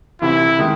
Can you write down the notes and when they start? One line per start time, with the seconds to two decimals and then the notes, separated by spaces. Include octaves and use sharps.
0.22 C2 C3 E3 E4
0.59 D#3 G#3